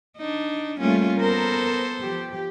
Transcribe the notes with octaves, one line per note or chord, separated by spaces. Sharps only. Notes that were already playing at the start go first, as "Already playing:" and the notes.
D4 D#4
G3 A3 A#3 C#4 F4
B3 A4 A#4 C5
F3 G4